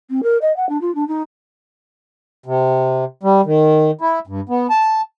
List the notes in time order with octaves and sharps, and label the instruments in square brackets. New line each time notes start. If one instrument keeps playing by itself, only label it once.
[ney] C4
A#4
D#5
F#5
D4
F4
D4
D#4
[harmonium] C3
G3
D#3
E4
G2
B3
A5